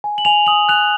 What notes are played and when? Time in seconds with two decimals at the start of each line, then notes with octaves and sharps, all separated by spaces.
0.04 G#5
0.18 F#7
0.25 G#5 F7
0.46 D#6 F#7
0.69 F#6 F7